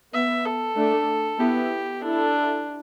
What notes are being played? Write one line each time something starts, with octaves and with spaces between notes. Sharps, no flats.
B3 E5
A4
A3 D4
B3 E4 G4
D4 E4 A4